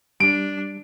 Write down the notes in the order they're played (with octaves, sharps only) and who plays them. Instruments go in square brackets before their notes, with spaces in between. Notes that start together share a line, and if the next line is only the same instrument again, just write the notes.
[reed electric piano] G3 [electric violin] D4 [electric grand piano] D7